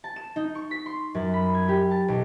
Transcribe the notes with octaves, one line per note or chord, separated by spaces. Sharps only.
A5
E7
D#4
C#6
B6
C6
F#2
B5
G#6
G4
A5
B1